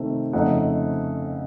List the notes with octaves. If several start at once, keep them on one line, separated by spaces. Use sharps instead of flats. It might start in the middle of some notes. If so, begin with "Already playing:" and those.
Already playing: C3 D#3 A3 C4
F2 C#3 A3 C4 D#4 F#5